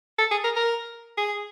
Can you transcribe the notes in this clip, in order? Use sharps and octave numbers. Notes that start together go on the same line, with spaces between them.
A4
G#4
A#4
A#4
G#4